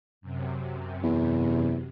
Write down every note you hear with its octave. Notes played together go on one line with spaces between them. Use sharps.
F#2 C3
E2